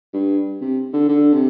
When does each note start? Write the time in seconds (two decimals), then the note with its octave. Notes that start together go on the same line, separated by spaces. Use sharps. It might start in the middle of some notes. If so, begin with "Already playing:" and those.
0.13 G2
0.61 C3
0.93 D3
1.08 D3
1.33 C3